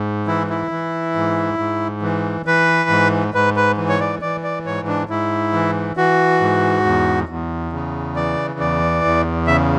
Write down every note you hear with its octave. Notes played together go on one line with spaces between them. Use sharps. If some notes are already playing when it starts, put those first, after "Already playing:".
Already playing: G#2
E3 E4
E4
E3
G#2
G#2
E3
E3 B4
G#2
G#2 B4
B4
E3
C#5
D5
E3 D5
D5
G#2 C#5
D4
G#2 E4
E3
E3 F#4
G#2
E2
E2
C#3
E3 D5
E2 D5
E2
C#3 E5